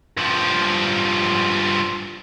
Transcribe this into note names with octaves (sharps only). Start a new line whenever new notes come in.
G2 F3